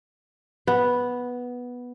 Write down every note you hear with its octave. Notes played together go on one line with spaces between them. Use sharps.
B3